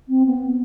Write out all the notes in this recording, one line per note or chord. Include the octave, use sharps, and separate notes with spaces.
C4
B3